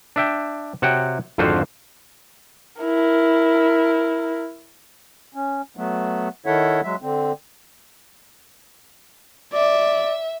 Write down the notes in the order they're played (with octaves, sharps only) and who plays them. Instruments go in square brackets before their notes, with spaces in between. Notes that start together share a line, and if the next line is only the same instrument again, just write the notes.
[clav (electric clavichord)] D4 E5 G5
C3 F#4 C#5 F#5 G5
G#1 F2 D3 F4 F#4 C5
[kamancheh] E4 A#4
[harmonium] C#4
F#3 A3 B3
D#3 E4 A4 C#5 E5 F#5
F#3 G#3 E5
D3 C4
[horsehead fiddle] D5 [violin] E5